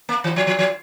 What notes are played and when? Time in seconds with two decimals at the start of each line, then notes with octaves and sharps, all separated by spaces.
0.09 A#3
0.24 E3
0.36 F3
0.47 F3
0.59 F3